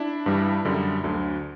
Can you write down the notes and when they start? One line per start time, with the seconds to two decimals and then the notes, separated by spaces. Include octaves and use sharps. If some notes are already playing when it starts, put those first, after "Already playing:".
Already playing: D4 E4
0.26 G2 E3 G3
0.65 F#2 D3 G3
1.03 D2 D3 F#3